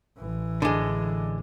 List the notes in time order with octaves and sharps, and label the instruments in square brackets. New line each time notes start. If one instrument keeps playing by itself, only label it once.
[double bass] A1 E3
[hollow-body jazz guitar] D3 G#3